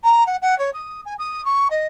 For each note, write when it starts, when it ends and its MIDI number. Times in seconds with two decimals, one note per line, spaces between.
0.04 0.24 82
0.26 0.36 78
0.42 0.58 78
0.58 0.70 73
0.74 1.01 87
1.05 1.14 80
1.18 1.44 87
1.45 1.68 85
1.70 1.87 75